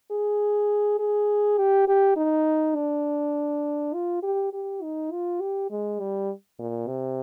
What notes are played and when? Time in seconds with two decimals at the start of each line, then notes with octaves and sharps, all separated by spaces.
0.11 G#4
0.99 G#4
1.58 G4
1.88 G4
2.17 D#4
2.76 D4
3.94 F4
4.23 G4
4.53 G4
4.82 D#4
5.12 F4
5.41 G4
5.71 G#3
6.00 G3
6.59 A#2
6.88 C3